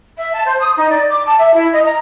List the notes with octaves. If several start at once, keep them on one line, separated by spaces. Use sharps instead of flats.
E5
A5
C5
D#6
D#4
D5
D6
A5
E5
E4
D#5
A#5